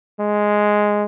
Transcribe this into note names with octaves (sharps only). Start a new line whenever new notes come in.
G#3